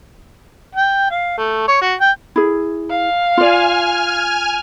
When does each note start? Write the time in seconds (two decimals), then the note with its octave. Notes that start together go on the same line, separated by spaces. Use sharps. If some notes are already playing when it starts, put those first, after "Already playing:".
0.75 G5
1.11 F5
1.38 A3
1.68 C#5
1.82 F#4
2.01 G5
2.36 E4 G#4
2.90 F5
3.37 F4 D5 G#5 F6